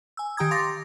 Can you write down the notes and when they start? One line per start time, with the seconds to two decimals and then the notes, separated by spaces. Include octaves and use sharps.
0.17 G#5 E6
0.37 D#3 G4 G5 A#5 D#6 G#6
0.51 F5 C6 D6 A6 A#6